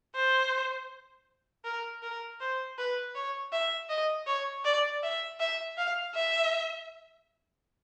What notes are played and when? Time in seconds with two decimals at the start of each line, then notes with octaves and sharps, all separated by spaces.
0.16 C5
1.65 A#4
2.03 A#4
2.41 C5
2.78 B4
3.15 C#5
3.52 E5
3.90 D#5
4.27 C#5
4.65 D5
5.03 E5
5.40 E5
5.78 F5
6.15 E5